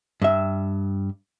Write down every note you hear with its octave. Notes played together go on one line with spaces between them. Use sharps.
G2 E5